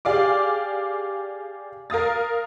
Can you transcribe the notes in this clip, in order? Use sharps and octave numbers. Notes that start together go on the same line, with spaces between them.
G4 G#4 D5 F5 D6
A#4 F5 D#6 A6